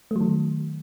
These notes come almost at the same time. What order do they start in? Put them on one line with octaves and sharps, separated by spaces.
A3 F#3 D#3